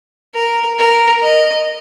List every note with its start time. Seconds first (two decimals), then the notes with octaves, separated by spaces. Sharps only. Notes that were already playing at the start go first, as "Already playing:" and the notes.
0.34 A#4
0.78 A#4
1.22 D#5